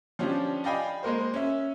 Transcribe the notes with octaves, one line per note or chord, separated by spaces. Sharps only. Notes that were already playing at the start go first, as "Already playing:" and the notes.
F3 C#4 D4 G4
D5 D#5 F5 G5 G#5 B5
G#3 A#3 A#4 C5
C#4 E5